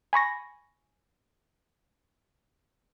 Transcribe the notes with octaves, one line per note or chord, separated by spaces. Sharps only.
G#5 B5 C#6 A#6